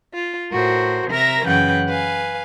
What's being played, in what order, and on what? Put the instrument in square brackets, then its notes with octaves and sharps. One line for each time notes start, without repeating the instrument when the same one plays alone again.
[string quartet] F4
A2 F#4 A#4 C5
C3 A#4 E5 A#5 A#6
F#2 C#3 E3 B4 F#5 G5
B4 F5 G#5